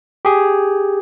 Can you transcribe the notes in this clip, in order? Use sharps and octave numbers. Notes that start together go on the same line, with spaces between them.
G4 G#4